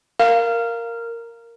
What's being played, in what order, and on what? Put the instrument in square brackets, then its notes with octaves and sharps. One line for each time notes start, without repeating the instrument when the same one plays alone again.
[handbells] A#4 [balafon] F5